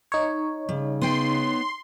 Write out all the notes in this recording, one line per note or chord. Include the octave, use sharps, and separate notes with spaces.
D#4 C#5
C#3 G3
B3 G5 C6